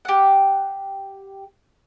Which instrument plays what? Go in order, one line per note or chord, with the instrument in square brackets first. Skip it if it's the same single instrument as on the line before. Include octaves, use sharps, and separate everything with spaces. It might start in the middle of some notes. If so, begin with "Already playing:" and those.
[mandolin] G4 F#5